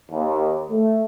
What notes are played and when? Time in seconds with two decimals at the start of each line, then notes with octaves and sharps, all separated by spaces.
0.11 D#2
0.70 A3